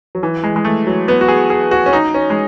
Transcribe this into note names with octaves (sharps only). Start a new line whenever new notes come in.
F#3
E3
G#3
G#3
A3
F#3
B3
F#4
G#4
G#4
F#4
C#4
D#4
C#4
G#3